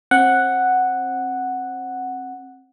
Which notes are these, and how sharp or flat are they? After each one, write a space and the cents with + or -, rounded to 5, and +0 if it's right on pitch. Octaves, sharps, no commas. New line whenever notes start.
C4 +30 F#5 +0